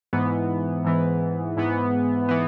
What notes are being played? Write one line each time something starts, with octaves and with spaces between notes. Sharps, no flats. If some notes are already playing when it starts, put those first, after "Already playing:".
G#2 E3 B3
G#2 E3 B3
G#2 E3 B3
E3 B3